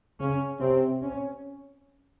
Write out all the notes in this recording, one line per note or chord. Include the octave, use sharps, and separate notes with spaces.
C#3 C#4
C3 C4
C#4